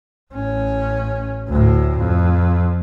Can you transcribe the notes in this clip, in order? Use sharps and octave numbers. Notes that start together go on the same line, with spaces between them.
A1 C#4
D2 A2
F2